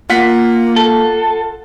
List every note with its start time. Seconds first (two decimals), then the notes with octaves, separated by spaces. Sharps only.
0.10 A#3 F4 F#5 B6
0.76 A4